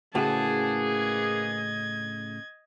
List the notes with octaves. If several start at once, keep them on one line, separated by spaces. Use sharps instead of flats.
A2 C#3 E3 A#3 F#4 G#4 A5
D#5 G#6